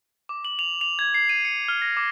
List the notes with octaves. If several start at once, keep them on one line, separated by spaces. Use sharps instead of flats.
D6
F#7
F7
F7
G#6
C7
D#7
C#7
F6
A#6
D6